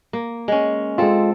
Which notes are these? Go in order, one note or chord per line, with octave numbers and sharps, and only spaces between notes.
A#3
G#3 C#4
G#3 C4 F4 A4